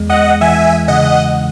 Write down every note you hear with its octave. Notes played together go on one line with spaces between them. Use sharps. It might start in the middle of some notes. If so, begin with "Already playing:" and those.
Already playing: E2 G#3
D#5 F#5
E3 E5 G#5
C#3 D#5 F#5